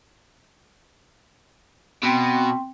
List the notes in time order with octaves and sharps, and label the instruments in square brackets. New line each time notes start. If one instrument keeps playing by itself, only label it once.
[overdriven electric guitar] B2 [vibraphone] C4 G5 C6